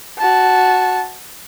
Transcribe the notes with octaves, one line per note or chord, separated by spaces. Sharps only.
F#4 A5